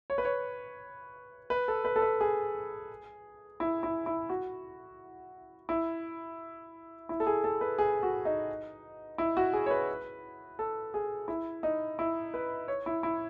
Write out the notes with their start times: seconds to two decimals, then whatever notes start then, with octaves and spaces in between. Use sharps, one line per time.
0.10 C#5
0.18 B4
0.25 C#5
1.50 B4
1.68 A4
1.85 B4
1.96 A4
2.02 B4
2.21 G#4
3.60 E4
3.83 E4
4.06 E4
4.29 F#4
5.69 E4
7.09 E4
7.20 A4
7.27 G#4
7.44 A4
7.61 B4
7.78 G#4
8.03 F#4
8.25 D#4
9.18 E4
9.37 F#4
9.53 G#4
9.66 C#5
9.71 B4
10.59 A4
10.94 G#4
11.28 E4
11.63 D#4
11.99 E4
12.34 B4
12.68 C#5
12.86 E4
13.03 E4